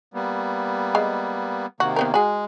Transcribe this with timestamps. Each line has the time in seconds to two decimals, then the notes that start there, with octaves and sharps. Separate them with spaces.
0.14 G3 A#3 B3
0.95 G#3 F5
1.80 C3 D#3 A#3 F#4
1.96 B3 C4 A#4
2.14 G#3 F#4 G#4